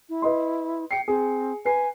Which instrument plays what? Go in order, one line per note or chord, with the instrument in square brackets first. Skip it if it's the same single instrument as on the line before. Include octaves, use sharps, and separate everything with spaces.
[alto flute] E4
[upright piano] B4 D#5 C6
[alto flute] G5 [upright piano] C7 C#7
[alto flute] C4 [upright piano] G#4
[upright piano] B4 C7 [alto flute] G#5